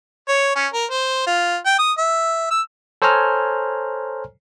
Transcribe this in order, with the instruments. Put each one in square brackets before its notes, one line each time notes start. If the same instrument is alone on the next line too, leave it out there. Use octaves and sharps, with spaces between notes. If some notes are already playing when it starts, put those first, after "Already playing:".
[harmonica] C#5
C#4
A#4
C5
F4
G5
D#6
E5
E6
[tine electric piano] A4 C5 C#5 G#5 A#5 F6